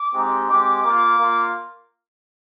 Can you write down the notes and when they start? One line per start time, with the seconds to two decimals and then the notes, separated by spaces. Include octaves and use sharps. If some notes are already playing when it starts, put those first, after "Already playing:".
Already playing: D6
0.14 G#3 C4 D#4 G4
0.49 G#3 C4 G4 D6
0.83 A#3 F4 D6
1.17 A#3 F4